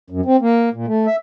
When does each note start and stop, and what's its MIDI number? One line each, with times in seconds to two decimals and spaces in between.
0.10 0.21 42
0.25 0.37 60
0.42 0.69 58
0.74 0.86 46
0.88 1.06 57
1.06 1.16 76